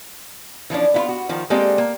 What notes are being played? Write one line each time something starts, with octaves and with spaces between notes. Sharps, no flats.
E3 F3 C#4 D4
B3 E4 F4
F#4
D#3 F3
G#3 A#3 C4 G4 A4 D5
A#3